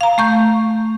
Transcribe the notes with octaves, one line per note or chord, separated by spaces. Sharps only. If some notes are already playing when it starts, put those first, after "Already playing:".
F5 A#5
A3 C#6 G6